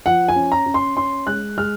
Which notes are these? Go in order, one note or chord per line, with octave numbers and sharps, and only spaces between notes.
F3 F#5
G#5
C#4
A#5
C#4
C6
C#4 C6
G#3 F#6
G#3 F6